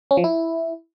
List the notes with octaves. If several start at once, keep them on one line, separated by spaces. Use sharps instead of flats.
C#4
F3
E4